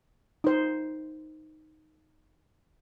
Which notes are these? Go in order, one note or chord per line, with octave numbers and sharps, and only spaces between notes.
D#4 C5